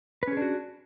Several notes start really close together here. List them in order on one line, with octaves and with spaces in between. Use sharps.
B4 C#4 G#4 D4 F#4